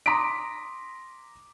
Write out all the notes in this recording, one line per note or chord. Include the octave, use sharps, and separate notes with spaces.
A#5 C6 D6 D#6 B6 D7